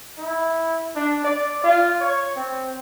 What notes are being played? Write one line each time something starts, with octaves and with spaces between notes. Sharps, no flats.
E4
D4
D5
F4
C#5
C4